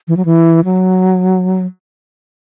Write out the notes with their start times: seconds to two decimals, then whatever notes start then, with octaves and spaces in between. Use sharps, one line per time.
0.08 E3
0.17 F#3
0.25 E3
0.65 F#3